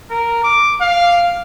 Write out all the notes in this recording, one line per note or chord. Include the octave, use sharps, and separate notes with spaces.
A#4
D6
F5